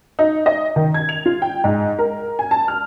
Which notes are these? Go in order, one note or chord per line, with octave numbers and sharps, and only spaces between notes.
D#4
D#5
D#3
G#6
F7
F4
G5
G#2
A#4
G#5
A5
F6